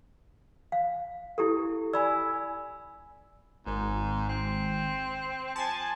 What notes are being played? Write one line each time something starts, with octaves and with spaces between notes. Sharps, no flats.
F5
E4 G4 A4
D5 G#5 B5 E6
G#1 G#2
C4
F3 G#5 A5